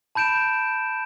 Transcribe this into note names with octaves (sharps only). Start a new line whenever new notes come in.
A5 B5 G6 D7 E7